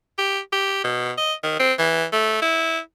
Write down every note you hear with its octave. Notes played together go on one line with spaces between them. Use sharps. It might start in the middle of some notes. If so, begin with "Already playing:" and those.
G4
G4
B2
D#5
D#3
C4
E3
A3
E4